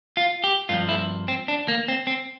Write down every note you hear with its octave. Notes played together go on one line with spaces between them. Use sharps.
F4
G4
G2 F3 F4
E4
C4
D4
A#3
C4
C4